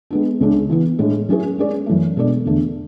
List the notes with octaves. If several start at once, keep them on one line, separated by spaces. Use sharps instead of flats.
G#3 B3 D4
C#2 C#3 G#3 D4
E3 B3 E4
A2 G#3 D4
F#3 C#4 E4 G#4
G#3 C#4 G#4 D5
F#2 E3 A3
B2 G#3 D4 A4 D5
E2 D3 A3 D4 A4